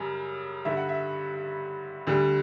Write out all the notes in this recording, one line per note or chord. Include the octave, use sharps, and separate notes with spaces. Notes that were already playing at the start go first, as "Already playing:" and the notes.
Already playing: F#2 C#3 G3
G2 D3 G3 E5
F#5
E5
D2 D3 G3